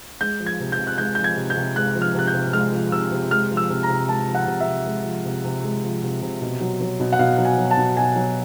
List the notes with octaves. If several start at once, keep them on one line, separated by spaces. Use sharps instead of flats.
G#3 G6
F3
G#6
C3
G6
C3
F#6
G#3 G6
F3 G6
G#6
C3
G6
C3
G#3 F#6
F3
F6
C3 F#6
G6
C3
G#3 F6
F3
C3 E6
C3
G#3 F6
F3
E6
C3
A#5
C3
G#3 A5
F3
F#5
C3
E5
C3
G#3
F3
C3
C3
G#3
F3
C3
C3
B2
F#3
F#3
B2
F#5
B2 F5
F#3
G#5
F#3
A5
B2
B2 G#5
F#3